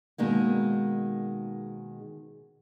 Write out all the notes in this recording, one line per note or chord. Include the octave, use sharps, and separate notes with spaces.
B2 D#3 G#3 A#3